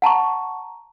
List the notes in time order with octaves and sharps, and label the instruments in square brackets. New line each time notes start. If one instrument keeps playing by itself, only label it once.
[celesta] F#5 A5 A#5 C#6